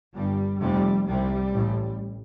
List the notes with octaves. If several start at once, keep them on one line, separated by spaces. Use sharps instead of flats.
G1 G2 G3
F1 F2 C3 G3
C2 C3 G3
A1 A2